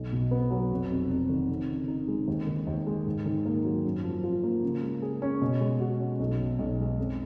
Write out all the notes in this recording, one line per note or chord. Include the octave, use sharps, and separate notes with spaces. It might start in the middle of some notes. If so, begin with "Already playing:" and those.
Already playing: B1
B2
B3
F#3
F1
F2
F1
D#3
F2
C#3
D#4
G#3
D#2
D#3
D#2
G#3
G#2
D#3
A#3
F#3
F#2
F3
F4
A#3
C#3
G#3
G#4
C#4
B2
G#3
F#4
C#4
B1
B2
B1
G#3
F2